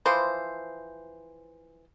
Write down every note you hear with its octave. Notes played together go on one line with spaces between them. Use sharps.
E3 F3 C5